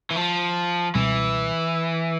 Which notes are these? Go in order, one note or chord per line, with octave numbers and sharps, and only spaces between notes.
E3
F3
C#2 B2 E3 G3 C4